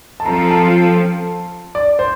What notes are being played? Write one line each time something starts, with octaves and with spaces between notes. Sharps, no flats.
A5
F3 C4 F4 A4 A#5
A5
D5
C5